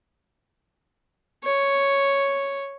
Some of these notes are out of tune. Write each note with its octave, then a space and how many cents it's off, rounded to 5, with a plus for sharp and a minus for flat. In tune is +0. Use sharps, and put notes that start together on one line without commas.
C#5 +0